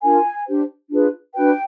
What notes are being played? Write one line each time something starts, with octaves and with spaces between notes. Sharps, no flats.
D4 F4 A#4 G#5
D4 G4 C5
D4 F4 G#4 B4
D4 F#4 B4 G5